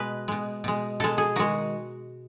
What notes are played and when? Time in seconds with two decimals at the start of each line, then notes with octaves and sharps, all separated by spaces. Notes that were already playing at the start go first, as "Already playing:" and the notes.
Already playing: B2 G#3 B4
0.28 B2 G#3
0.64 B2 G#3
1.00 B2 G#3 A4
1.18 G#4
1.36 D#3 G#3 F#4